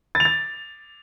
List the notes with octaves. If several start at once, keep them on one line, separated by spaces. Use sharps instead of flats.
A6
F7
A6